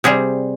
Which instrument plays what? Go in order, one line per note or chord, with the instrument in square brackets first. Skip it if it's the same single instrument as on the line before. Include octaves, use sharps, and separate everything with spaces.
[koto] C3 G3 G#4